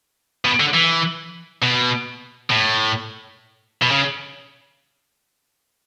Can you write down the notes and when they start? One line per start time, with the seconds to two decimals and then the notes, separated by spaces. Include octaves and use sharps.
0.45 B2
0.60 D3
0.74 E3
1.62 B2
2.50 A2
3.82 B2
3.91 C#3